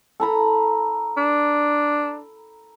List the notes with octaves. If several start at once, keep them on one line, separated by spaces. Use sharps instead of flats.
A4 A#5 B5
D4